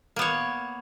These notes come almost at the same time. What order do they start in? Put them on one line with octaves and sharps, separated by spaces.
A#3 B3 C#5